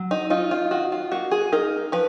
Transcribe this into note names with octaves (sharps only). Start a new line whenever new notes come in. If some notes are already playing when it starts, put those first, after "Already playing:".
Already playing: F#3
D#4
D#4 F4
F4
D#3 F#4
F4
A#3 F#4
G#4
D#4 A#4
F3 B4